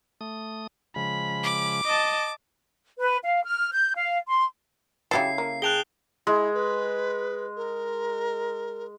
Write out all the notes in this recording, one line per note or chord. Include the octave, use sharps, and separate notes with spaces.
A3 D#6
C#3 F3 G#3 B5
D6
D#5 A5
B4
F5
F6
G6
F5
C6
C#3 F#3 E4 G4 A4 C7
A#3
G#4 G5 A5 F#6 F7 G7
G#3 E4
B4
A#4